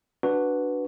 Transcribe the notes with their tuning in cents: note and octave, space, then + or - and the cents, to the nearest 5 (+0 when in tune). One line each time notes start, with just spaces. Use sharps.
D4 +0 F#4 +0 B4 +0